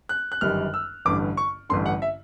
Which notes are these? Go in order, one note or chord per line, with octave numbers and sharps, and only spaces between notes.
F#6
F#6
G1 F#2 D#3 G3 F6
E6
A1 G2 D3 D6
C#6
A1 G2 D3 C6
F#5
E5